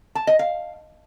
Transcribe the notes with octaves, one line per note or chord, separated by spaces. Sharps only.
A5
D#5
F5